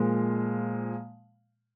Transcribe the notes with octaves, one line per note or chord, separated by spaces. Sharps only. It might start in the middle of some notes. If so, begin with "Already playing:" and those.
Already playing: A#2 F3 G#3